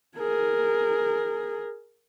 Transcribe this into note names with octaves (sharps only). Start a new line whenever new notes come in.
G#4 A#4